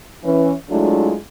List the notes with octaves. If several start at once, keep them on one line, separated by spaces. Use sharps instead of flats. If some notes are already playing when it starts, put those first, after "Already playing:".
E3 C#4
F#3 G#3 A3 D4 E4 F4